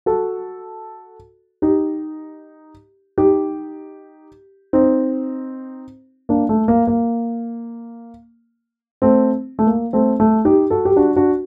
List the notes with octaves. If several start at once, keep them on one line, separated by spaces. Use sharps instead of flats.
F#4 A4
D#4 G4
D#4 G4
C4 D#4
A#3 D4
A3
A#3
A#3
A3 C4
A3
A#3
A3 C4
A3
D#4 G4
F#4 A4
G4
D4 F#4
D4 F#4